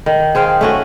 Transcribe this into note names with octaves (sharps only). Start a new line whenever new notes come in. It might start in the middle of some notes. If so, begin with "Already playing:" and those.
D#3
G#4 C5 F5 G5
A3 C#4 F#4